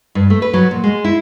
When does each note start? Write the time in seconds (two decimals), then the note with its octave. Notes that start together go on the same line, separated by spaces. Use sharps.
0.15 G2
0.30 A3
0.42 B4
0.53 F#3
0.71 A#2
0.84 G#3
1.05 E4